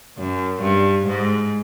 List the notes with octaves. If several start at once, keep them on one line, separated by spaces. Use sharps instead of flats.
F#2
G2
G#2